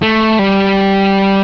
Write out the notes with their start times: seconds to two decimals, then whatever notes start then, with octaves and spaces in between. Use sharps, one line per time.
0.02 A3
0.39 G3